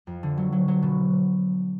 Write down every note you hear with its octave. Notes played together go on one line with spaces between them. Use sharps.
F2
D3
F#3
F#3
F#3
B2